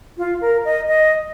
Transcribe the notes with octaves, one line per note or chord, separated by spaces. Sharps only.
F4
A#4
D#5
D#5